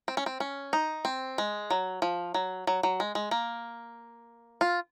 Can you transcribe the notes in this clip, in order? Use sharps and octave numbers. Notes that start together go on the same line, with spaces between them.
C4
C#4
C4
C#4
D#4
C4
G#3
F#3
F3
F#3
F#3
F#3
G#3
G#3
A#3
F4